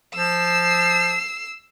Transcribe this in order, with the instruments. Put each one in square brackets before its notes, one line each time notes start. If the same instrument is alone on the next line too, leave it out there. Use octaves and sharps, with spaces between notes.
[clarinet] F3 [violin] E6 C7